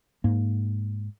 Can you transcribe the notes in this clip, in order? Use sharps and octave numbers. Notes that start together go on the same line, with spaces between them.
G#2 A#3